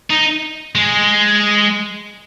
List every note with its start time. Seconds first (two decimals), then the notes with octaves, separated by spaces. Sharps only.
0.10 D#4
0.75 G#3